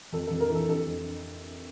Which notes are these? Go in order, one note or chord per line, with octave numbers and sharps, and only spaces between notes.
F2 A4
A4
F2
A#4
E3
A4
F2 A4
F2